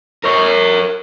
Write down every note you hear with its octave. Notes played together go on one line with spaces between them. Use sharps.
A#4 C#5